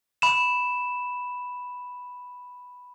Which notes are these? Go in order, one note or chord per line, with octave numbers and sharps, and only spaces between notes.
B5 E7